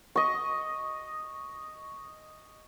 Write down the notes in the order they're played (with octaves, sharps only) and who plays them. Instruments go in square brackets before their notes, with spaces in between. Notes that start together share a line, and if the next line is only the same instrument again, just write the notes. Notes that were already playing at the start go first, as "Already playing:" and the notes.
[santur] D#5 C#6